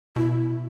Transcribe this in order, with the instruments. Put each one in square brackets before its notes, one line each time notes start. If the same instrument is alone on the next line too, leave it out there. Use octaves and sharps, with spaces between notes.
[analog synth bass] B2 [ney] E4